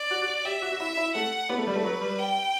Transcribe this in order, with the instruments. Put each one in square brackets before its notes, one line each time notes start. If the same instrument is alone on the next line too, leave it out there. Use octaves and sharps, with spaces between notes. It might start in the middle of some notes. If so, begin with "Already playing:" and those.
Already playing: [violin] D5
[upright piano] F#4
F#4
[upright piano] G4 [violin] E5
[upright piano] F#4
F#4
[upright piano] E4 [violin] E5
[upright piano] E4
[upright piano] A3 [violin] F#5
[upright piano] B3 [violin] B4
[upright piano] A3
G3
A3
F#3
G3
[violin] G5